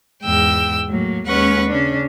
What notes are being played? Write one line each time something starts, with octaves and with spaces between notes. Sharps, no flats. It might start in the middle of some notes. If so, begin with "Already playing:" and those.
E2 G#2 G5 E6
A2 F#3 A#3
D#2 G#3 C#4 B4 F#5 C#6
C#3 C#4 D4